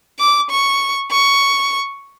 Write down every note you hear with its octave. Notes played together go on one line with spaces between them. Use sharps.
D6
C#6
C#6